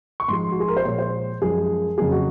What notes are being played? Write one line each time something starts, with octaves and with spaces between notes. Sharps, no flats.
C#6
G#2 F3 G#3 C6
F#4
G#4
A#4
C5
A#2 F3 G#3 C#5
C5
F#2 F3 G#3 G#4
F2 C#3 F#3 A#3 G#4
F#4